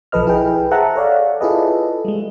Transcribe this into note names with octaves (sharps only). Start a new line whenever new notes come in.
B1 F3 A4 B4 D#5 F6
E4 G#4 B4 G5
G#4 C5 E5 F#5 A5 A#5
A4 C#5 D5 F5
E4 F4 G#4 A4 B4 D#5
G3 G#3